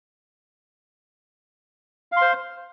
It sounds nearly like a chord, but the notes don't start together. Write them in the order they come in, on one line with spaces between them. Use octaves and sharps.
F5 C6 C5